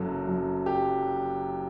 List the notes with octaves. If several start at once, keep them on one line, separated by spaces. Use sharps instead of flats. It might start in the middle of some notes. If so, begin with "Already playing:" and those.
Already playing: F#1 F#2 F#3 A4
F#2
G4